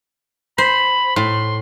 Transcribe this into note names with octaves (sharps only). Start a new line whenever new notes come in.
C5 B5
A2 C6